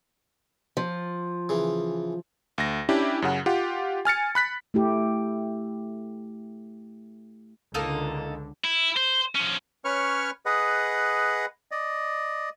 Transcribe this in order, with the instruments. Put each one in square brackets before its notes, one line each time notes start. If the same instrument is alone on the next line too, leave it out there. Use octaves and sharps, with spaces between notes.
[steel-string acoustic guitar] F3
[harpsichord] C#3 E3
[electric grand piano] D2 A#6
C#4 D4 E4 G4
F#2 C#3 F#5
F4 G4 F#5
G#5 F6 A6 C#7
B5 F#6 B6
[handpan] A3 E4 G4
[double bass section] C#2 D3 [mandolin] A#3 D#4 A4
[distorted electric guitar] E4
C5
F3 C#4
[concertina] C#4 B4 C#5 C#6 F6
G#4 B4 D#5 F#5
D5 D#5